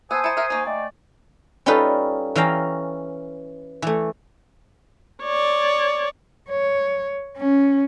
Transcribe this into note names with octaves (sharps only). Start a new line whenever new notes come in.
B3 C5 G#5 A5 D#6 E6
E4 A5 A#5 C#7 D#7
A#4 E5
A#3 D#4 C6 C#6
A3 D5 D#5 G5 G#5
G3 C#4 D#4 F4 A4 B4
E3 C#4 F5 G5 A#5
E3 A3
C#5 D5
C#5
C#4